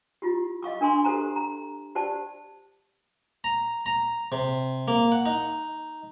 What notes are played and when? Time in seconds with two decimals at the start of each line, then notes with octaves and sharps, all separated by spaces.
0.22 E4 F4 G4
0.63 D#5 F5 C#6 D6
0.81 D4 A#4 G#5 C6 C#6
1.05 G4 A4 C5 A#5
1.36 A#5
1.95 G4 C5 D5 A5
3.44 A#5
3.86 A#5
4.32 C3
4.88 A#3
5.12 F#5
5.25 D#4